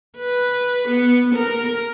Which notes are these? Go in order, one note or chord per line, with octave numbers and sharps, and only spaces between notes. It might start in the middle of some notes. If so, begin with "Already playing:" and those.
B4
B3
A#4